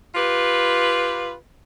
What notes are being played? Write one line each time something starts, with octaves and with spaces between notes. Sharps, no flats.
F4 G4 B4